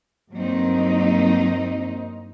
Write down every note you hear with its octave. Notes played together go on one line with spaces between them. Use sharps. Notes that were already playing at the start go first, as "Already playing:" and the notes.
G2 F#3 A#3 C4 D#4